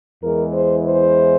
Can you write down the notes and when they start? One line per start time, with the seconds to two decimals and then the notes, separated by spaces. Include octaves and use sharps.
0.22 E2 E3 G#3 A#4
0.54 C5
0.85 C5